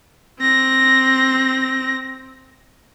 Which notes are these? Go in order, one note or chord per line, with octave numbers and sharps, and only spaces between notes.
C4 A#6